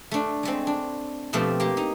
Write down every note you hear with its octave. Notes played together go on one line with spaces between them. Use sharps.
A3 D4
G#3 A3 C4
D4
B2 F3 A3 C4 G4
A#3 G4
D#4